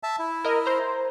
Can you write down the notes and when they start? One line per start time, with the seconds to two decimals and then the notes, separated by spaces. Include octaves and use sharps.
0.03 E5 A5
0.19 E4
0.44 A#4 D#5
0.66 C5 A#5